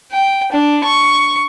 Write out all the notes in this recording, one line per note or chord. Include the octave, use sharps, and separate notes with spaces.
G5
D4
C#6